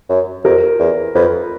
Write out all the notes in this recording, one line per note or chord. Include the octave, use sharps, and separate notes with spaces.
F#2
F2 A#4
E2
F2 B4